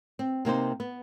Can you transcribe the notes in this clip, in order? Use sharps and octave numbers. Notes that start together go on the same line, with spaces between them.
C4
C3 A#3 D#4 C5
B3